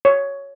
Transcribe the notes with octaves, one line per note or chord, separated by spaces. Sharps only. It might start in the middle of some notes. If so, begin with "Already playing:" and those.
C#5